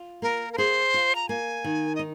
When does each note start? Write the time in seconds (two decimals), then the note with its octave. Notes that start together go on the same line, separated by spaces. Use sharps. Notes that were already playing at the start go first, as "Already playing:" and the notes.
Already playing: F4
0.22 A#3 A#4
0.53 A#4
0.58 G#4 C5
0.94 F4
1.15 A#5
1.29 A#3 G#5
1.64 D#3
1.95 D#5
1.99 D#4